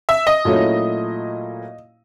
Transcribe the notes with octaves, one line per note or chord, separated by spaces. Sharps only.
E5
D#5
A#2 F#3 A3 C#4 E4